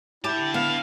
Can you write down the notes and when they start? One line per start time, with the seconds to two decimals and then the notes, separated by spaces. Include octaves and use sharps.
0.24 D3 E4 G4 A5
0.54 B3 F5